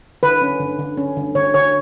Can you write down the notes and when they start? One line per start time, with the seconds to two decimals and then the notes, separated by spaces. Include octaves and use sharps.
0.23 D3 B4
0.42 C#4
0.60 D3
0.79 D3
0.98 C#4
1.17 D3
1.35 D3 C#5
1.54 D3 C#5